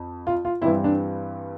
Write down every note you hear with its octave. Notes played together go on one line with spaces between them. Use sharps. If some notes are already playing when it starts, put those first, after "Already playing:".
Already playing: F2
F4
F4
G2 E3 G3 C4 E4
D4